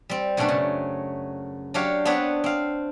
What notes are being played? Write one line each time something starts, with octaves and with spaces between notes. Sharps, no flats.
G3 C4
F#2 B2 F#3 A3 D4
C#3
F#3 D4 G4 C#5 F5
B3 C4 D4 B4 C#5 F#5
C4 F5